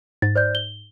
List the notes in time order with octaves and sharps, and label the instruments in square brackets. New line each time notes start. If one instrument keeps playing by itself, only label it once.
[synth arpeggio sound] G#2 [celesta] A6
[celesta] C5 D5 G6
G7